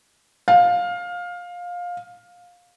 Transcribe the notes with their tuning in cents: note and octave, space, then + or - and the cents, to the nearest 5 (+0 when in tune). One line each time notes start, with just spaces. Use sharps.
F5 +20